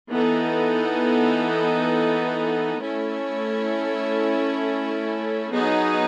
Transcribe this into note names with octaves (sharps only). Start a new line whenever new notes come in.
E3 B3 D#4 A4
A3 C#4 E4 A4 C#5
F#3 B3 D#4 G#4